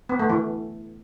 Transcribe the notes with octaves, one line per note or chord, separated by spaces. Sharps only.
B3
A3
E3